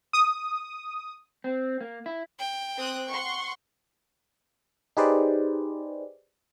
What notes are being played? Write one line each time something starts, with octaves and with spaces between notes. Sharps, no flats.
D#6
C4
A#3
E4
G5
C4 D#6 F#6
F#5 C6 C#6
D#4 G4 G#4 B4 C5 D5